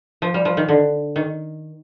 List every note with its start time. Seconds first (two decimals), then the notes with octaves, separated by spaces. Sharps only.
0.22 F3
0.34 G3
0.45 F3
0.57 D#3
0.69 D3
1.16 D#3